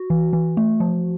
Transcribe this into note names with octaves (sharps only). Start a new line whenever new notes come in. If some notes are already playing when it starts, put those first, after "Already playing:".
Already playing: F#4
E3
E3
A3
F3